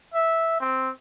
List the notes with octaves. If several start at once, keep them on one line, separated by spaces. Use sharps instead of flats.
E5
C4